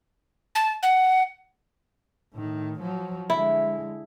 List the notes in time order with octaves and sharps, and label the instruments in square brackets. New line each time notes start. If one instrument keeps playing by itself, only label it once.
[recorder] A5
F#5
[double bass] A2 D#3
F3 F#3
[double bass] D3 G#3 [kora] E4